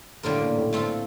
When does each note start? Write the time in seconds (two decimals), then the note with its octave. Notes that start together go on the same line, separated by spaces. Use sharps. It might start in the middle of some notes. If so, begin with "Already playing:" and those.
0.23 A2 D3 G3 A#3 F4 A#4
0.41 A#2
0.57 A2
0.73 A3 C4 F4 A4